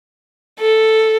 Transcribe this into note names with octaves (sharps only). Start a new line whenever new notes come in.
A4